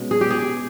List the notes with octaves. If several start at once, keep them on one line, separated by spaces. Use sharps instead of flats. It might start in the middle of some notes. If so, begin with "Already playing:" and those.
Already playing: B2 G#3 C#4
G#4
G4
G#4